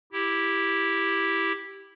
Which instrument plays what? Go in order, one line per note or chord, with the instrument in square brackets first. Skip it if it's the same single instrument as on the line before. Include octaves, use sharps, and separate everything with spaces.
[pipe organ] E4 G4